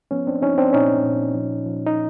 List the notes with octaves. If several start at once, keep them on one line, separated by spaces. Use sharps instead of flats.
F3 B3 C#4
C4 D4
F3 C#4 D#4
C4 D4
A#2 C#4 D#4
A#2
F3
F3
D#4